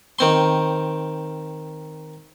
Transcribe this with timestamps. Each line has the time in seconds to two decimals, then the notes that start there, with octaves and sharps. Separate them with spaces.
0.19 D#3 C4 C6